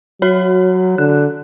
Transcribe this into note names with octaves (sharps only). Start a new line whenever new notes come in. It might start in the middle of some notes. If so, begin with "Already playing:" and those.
F#3 F#4 C#5
D3 F#6